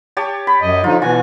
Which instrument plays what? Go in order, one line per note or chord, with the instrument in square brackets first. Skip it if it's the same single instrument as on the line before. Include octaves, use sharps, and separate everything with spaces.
[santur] G4 C#5 A5
B5
[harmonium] F#2 D#5
[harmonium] D3 F3 D#4 [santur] F4
[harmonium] B2 E3 G#5 [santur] F4